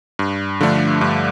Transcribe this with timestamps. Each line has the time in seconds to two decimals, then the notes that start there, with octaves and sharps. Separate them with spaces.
0.19 G2
0.61 D3 F3 A3 D4
1.01 G2